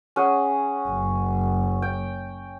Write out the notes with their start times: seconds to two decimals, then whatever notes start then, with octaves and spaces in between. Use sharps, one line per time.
0.16 C#4 G#4 F#5
0.88 F#1
1.82 G5